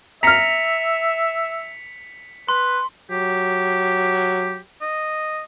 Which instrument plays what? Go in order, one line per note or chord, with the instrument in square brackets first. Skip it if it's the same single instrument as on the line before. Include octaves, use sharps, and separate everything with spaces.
[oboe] E5 [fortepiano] A#5 F6 [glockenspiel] B6 C#7 F7
[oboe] B4 [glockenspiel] C6
[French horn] F#3 [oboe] G4
[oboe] D#5